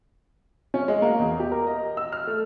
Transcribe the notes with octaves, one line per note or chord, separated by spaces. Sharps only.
C#4
G#3
A#3
E2
G4
A#4
D#5
E6
F6
A3